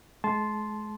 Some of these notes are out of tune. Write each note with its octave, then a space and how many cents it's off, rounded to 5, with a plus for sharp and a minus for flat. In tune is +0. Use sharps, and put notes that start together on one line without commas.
G#3 +35 A5 -15 C6 +0